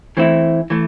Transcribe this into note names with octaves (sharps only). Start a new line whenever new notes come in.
E3 A3 C4 E4
E3 A3